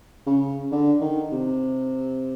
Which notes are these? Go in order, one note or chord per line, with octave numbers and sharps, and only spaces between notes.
C#3
D3
D#3
C3